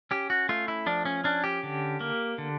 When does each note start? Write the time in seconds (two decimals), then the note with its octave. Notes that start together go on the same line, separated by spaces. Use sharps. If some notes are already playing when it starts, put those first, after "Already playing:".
0.11 C#4 G4
0.30 F#4
0.49 A3 F4
0.68 E4
0.86 F3 D4
1.05 C#4
1.24 C#4 D4
1.44 G4
1.63 D3
2.00 A#3
2.38 D3